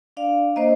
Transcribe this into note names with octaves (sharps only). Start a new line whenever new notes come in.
D4 D5 F5
A#3 C5 D#5